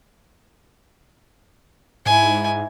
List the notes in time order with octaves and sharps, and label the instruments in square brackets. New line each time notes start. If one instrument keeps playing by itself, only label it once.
[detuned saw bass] G#2 [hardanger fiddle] E4 G#5